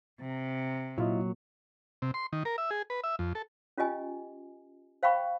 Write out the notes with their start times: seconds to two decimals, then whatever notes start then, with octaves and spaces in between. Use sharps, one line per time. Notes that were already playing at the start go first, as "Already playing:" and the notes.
0.20 C3
0.98 A#2 F#3 E4 F4 D#5
2.02 C3
2.14 C6
2.33 D#3
2.45 A#4
2.58 E5
2.71 G#4
2.90 B4
3.04 E5
3.19 F2
3.35 A4
3.78 C#4 F4 G4 D#5 G#5
5.03 C5 F5 G5 B5 C#6